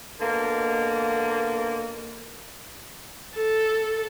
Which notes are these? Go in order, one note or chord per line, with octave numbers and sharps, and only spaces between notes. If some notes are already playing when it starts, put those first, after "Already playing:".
B2 D3 A#3
A4